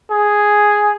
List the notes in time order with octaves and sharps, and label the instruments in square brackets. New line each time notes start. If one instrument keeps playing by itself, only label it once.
[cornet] G#4